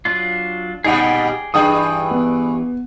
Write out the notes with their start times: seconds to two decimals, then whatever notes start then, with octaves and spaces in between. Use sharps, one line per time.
0.05 F#3 D4 F4
0.84 A#2 G3 D#4 G#4 D5 G5
1.54 G2 E3 D4 G#4 G5 A5 D#6
2.11 B3